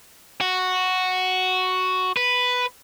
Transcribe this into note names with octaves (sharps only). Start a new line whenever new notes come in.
F#4
B4